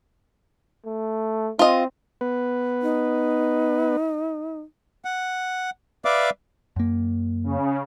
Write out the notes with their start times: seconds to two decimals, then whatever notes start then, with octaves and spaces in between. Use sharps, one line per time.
0.86 A3
1.59 C4 F4 D#5
2.21 B3 B4
2.82 D#4
5.05 F#5
6.05 B4 D5 E5 F5 D6
6.76 F#2 A#3
7.44 C#3